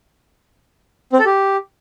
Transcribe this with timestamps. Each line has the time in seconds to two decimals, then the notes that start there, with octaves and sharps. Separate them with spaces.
1.13 C4
1.19 A4
1.25 G4